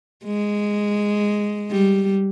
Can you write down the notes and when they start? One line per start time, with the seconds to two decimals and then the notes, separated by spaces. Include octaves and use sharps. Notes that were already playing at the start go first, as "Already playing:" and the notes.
0.25 G#3
1.71 G3